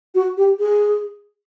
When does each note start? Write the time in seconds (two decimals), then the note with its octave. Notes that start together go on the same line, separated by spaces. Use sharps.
0.15 F#4
0.37 G4
0.59 G#4